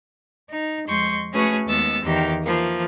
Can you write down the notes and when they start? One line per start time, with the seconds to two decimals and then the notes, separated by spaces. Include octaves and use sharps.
0.50 D#4
0.87 F2 G#3 C6 C#6 G6
1.32 A3 C#4 F#4 G#4 B4
1.67 D#2 G#3 B3 E6 A6
2.03 E2 D#3 G4
2.45 E3 F3 A#3